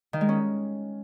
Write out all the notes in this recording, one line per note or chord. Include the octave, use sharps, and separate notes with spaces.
D#3
G#3
C#4